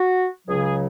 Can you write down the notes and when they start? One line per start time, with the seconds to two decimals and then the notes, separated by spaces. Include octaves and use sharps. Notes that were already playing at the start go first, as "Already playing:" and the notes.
Already playing: F#4
0.48 C#2 C#3 F#3 G#4
0.63 G#4